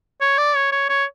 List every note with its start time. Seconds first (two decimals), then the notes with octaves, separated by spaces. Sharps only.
0.21 C#5
0.38 D5
0.55 C#5
0.72 C#5
0.89 C#5